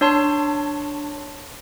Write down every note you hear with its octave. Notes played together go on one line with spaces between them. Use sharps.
D4 C#5 A5 C6